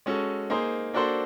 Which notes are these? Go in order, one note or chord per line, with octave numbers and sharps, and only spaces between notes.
G#3 C#4 F#4 A4
A#3 D#4 G#4 C5
A#3 D4 F#4 A4 C5